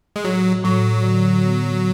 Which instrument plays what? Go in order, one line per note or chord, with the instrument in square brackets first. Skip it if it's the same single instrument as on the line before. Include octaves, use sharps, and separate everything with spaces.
[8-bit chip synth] G#3
[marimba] A2 [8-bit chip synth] F#3
[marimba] A2 [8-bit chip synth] F#3
[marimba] D3
B3